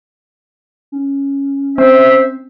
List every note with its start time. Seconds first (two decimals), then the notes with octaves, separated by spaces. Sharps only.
0.92 C#4
1.78 C4 C5 E5